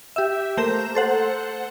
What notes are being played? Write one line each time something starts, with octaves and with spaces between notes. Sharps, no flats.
G4 E5
A3 A#3 C5 A#5 G6 E7
A4 C5 F#5